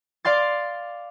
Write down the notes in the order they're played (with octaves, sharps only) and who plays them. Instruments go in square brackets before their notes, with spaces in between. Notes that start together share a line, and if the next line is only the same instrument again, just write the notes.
[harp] D5 F5 C6 A6